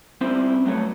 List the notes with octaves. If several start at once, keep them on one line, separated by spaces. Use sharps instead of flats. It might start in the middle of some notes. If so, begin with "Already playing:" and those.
G3 C4 C#4 E4 C5
G2 F#3 A3 C#5